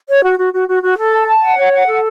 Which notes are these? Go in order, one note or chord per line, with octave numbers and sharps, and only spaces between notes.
C#5
F#4
F#4
F#4
F#4
F#4
A4
A5
A5
F#5
C#5
F#5
A4